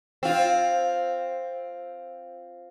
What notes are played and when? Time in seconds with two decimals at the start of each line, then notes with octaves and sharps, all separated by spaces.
0.23 C4 F4